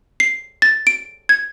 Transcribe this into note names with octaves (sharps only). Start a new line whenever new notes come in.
C7
A6
D7
G#6